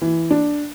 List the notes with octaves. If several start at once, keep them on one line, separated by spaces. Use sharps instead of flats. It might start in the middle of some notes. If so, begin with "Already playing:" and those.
E3
D4